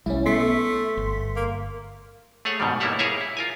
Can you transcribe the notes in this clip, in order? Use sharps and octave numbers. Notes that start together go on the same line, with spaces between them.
B1 G3 C#4 E4
A3 B3 C6 B6
G1
A#3
A3 G#4 C#5 F#5
G#2 B2 D#3 G3
G3 A#3 B3 E4 C#5 F#5
E4 G#4 A#4 C#5 E5 F5
E4
F4 A#4 G#5